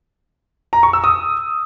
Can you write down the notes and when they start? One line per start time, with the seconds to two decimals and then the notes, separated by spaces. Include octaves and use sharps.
0.73 A#5
0.83 C#6
0.93 E6
1.04 D#6